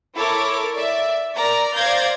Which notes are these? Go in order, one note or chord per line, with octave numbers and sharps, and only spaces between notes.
E4 A4 A#4 C#5 D6
D5 E5
A#4 D5 A#5
C5 D5 F5 G6 G#6 A#6